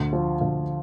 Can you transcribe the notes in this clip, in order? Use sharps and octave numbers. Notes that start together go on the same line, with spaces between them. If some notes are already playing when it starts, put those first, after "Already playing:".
Already playing: D2
F3
D2